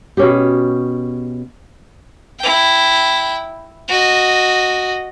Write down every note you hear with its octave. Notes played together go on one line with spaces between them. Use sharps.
B2 C#4 G4
E4 G5
F#4 D#5